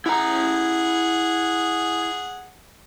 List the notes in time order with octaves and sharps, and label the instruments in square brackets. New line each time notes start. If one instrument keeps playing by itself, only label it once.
[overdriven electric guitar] E4 A#5 [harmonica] G#4 F#5